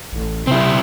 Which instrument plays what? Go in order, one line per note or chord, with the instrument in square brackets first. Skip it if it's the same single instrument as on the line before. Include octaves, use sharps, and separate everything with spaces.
[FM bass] A1
[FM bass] C3 [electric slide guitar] C4 E4